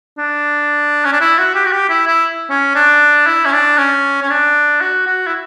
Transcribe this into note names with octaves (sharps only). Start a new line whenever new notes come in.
D4
C#4
D4
E4
F#4
G4
F#4
G4
E4
E4
C#4
D4
E4
C#4
D4
C#4
C#4
D4
F#4
F#4
E4